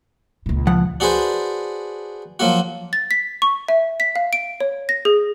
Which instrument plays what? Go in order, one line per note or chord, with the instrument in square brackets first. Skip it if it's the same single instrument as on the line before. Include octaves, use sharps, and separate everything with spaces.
[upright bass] C#2 A#2
[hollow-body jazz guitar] F3 F#5
[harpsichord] D4 F#4 G#4 B4 C5
F3 F#3 A#3 F#4
[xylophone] A6
B6
C#6
E5
B6
F5
D7
C#5
A#6
G#4